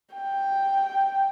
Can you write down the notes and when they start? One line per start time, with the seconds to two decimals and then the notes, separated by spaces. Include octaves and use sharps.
0.15 G5